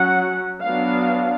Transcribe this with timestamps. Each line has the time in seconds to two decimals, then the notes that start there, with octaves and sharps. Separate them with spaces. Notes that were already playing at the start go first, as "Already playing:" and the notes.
Already playing: F#3 C#4 F#5
0.63 F#3 B3 D4 F5